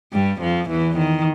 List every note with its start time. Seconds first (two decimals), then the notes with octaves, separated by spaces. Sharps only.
0.12 G2 G3
0.41 F2 F3
0.69 E2 E3
0.98 D#3